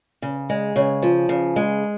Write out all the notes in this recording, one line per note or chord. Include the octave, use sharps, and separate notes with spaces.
C#3
G#3
C#3
F3
C#3
G#3